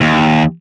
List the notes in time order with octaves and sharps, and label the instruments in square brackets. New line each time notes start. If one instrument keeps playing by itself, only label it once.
[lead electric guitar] D#2